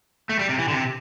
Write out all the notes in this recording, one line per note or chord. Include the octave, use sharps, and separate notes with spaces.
A3
G3
C3
E3
D3
C3